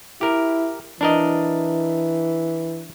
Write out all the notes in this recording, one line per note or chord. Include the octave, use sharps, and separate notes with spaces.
E4 G4 A#4
E3 D4 A#4 D#5